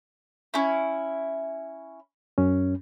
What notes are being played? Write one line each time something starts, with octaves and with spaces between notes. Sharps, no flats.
C#4 E4
F#2 C#4